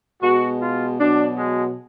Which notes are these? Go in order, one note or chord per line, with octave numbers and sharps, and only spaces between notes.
B2 G#3 F#4
F4
B2 F#3 D4
G#3